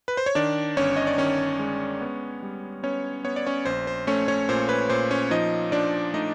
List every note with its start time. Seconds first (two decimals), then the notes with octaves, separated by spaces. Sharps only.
0.08 B4
0.17 C5
0.26 C#5
0.35 D#3 D4 D5
0.77 G1 C#4 C#5
0.96 D#5
1.07 D5
1.18 D#3 C#4 C#5
1.59 G#3
2.00 B3
2.42 G3
2.83 B3 C#4 C#5
3.24 B3 C#5
3.36 D5
3.46 C#4 C#5
3.65 A#1 C5
3.87 C5
4.07 A3 C#4 C#5
4.28 C#4 C#5
4.49 A#2 C5
4.69 B4
4.89 A#2 C5
5.11 C#4 C#5
5.31 F3 D#4 D#5
5.72 F3 D4 D5
6.13 A3 D#4 D#5